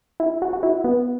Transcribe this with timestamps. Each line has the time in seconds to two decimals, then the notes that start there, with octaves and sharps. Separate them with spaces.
0.20 E4
0.42 F#4
0.53 F#4
0.63 E4
0.84 B3